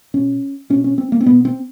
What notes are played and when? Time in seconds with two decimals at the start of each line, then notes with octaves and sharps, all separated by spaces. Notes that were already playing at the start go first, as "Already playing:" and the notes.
0.14 B2 C#4
0.70 B2 C#4
0.84 C#4
0.98 C4
1.12 A#3
1.21 C4
1.26 B2 B3
1.45 C4